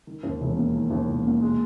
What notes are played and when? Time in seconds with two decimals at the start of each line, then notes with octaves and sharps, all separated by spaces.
0.07 D#3
0.23 D#2
0.41 E1
0.57 A#3
0.75 D#3
0.91 D#2
1.08 E1
1.25 A#3
1.41 G#3